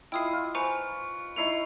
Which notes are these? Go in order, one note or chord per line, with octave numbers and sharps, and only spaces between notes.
E4 F4 D#5 G5 D#6 C7
F4
B4 C5 G#5 A#5 C#6 C#7
D#4 E4 C#5 C7 C#7 F7